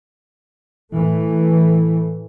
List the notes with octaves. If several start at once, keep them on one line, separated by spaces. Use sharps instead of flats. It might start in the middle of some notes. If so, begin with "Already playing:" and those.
A2 E3 A3